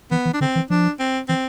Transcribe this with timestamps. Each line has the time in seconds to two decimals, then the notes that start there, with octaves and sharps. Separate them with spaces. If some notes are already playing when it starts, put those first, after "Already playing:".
0.11 E3 B3
0.25 E3
0.34 D4
0.41 D3 C4
0.56 E3
0.70 F3 D4
0.99 C4
1.28 E3 C4